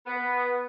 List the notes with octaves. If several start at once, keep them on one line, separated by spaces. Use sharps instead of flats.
B3